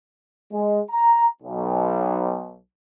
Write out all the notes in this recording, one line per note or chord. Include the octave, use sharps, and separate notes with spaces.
G#3
A#5
B1